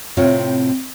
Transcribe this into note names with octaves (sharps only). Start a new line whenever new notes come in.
A2 C3 C4 F4 C#5